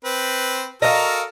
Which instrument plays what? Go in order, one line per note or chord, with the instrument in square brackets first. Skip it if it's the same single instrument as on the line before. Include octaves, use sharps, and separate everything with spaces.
[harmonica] C4 B4
[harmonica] F#4 A4 A#4 [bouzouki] D#5 F5